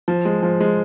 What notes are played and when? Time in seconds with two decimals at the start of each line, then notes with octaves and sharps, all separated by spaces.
0.08 F3
0.25 G#3
0.43 F3
0.60 G#3